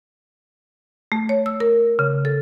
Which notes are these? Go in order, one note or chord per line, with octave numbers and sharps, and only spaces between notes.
A3
C#5
E6
A#4
C#3
A4